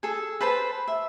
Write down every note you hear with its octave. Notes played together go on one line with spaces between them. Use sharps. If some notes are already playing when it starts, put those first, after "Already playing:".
G#4 A4
B4 C5 A5 B5
E5